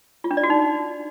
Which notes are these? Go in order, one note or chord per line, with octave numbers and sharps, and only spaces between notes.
F4
D4
D5
F#4
D#4